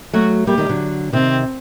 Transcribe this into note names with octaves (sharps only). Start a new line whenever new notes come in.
F#3 A3 F#4
G3 A#3 G4
D#3 G3
D3 F#3
C3 D#3 C4